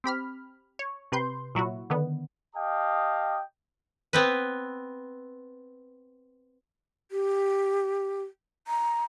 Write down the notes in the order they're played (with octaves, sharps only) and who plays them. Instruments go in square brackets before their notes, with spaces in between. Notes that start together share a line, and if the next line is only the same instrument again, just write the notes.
[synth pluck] C4 G4 B5 F6
C#5
C3 B4 C6 G6
A#2 F#3 E4 F#4
D3 D#3 B3
[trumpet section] G4 D#5 F5 G5 A5 D#6
[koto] B3 C4 B4
[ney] G4
A#5